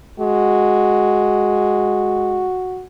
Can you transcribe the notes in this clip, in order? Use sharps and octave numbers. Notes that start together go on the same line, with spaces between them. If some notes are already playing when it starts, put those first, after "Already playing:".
G#3 F#4